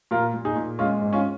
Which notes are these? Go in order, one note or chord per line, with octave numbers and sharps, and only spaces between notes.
A#2 F4 A#4
A#2
D#4 G#4
A#2
G#3 C#4 F4
G#2
C#4 F4